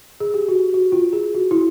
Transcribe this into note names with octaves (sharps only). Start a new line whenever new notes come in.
G#4
G4
F#4
F#4
F4
G#4
F#4
E4